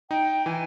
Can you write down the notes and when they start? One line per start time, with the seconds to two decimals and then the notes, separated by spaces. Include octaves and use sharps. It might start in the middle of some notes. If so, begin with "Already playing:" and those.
0.11 D#4 G5
0.46 E3 G#5